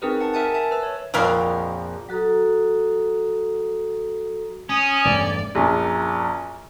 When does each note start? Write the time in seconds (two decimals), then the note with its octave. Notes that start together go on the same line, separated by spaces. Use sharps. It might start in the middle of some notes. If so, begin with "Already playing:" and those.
0.02 C4 D#4 G#4 A#4 B4
0.21 F#5 A5
0.34 A#4 E5 G#5 A5
0.54 E5 A5
0.71 B4 E6
0.83 C#5
1.14 A#1 F2 F#3 A#4 F5
2.09 F#3 F#4 A4 A#5 D#6
4.69 C#4 D#6
5.05 E1 G2 A3 D5
5.55 A#1 F#2